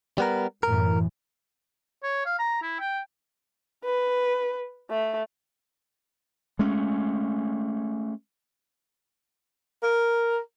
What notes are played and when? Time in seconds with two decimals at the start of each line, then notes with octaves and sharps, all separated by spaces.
0.18 G3 B3 A#4
0.63 F#2 A2 E3 A#4
2.03 C#5
2.26 F5
2.39 A#5
2.62 E4
2.80 G5
3.84 B4
4.90 A3
6.59 G#3 A3 C#4
9.83 A#4